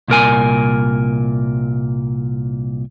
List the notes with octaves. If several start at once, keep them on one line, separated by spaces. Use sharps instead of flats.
C2 A#2 A#4 G#5